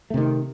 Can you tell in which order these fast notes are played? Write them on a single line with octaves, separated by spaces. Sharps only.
A3 C3 D#3